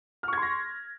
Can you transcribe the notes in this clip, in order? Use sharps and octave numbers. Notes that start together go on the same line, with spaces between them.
C6 C#6 F6 G#6 A#6